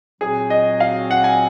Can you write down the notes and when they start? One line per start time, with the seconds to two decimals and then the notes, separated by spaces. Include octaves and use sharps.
0.21 A#2 F#3 C4 F#4 G#4
0.50 D#5
0.80 F5
1.11 F#5
1.24 G#5